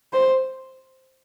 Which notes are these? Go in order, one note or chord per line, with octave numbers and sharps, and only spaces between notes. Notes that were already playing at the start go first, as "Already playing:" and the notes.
C5